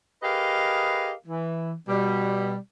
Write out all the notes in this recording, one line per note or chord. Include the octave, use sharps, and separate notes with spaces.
G4 G#4 A#4 B4 D#5 F5
E3
B2 G3